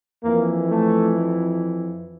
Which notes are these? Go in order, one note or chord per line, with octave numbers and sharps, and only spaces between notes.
F2 E3 A#3
A3